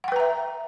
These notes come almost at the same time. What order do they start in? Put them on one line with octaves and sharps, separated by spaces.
F#5 G5 B4 A#5 E5